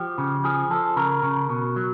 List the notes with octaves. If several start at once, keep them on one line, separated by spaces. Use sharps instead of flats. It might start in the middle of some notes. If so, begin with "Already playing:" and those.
Already playing: F3 G4
C#3
F3 G#4
F3 A4
C#3 A#4
C#3
B2
F#3